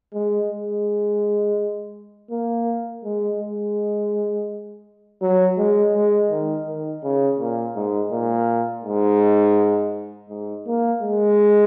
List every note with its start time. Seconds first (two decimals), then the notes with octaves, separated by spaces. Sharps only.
0.14 G#3
0.49 G#3
2.31 A#3
3.04 G#3
3.40 G#3
5.22 F#3
5.58 G#3
5.94 G#3
6.30 D#3
6.67 D#3
7.03 C#3
7.39 A#2
7.75 G#2
8.11 A#2
8.84 G#2
10.29 G#2
10.66 A#3
11.02 G#3